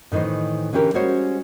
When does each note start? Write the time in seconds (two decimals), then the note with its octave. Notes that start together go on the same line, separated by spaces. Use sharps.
0.12 A2 D#3 E3 D#4 C5
0.73 D3 E3 C#4 G4 A#4
0.94 G3 G#3 C#4 F#4 C5 C#5